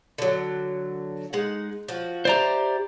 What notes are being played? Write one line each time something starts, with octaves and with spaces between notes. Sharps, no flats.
D3 F#3
G#3 D#4 F#5
F3 F#4
E4 F4 G4 C5 D5 A#5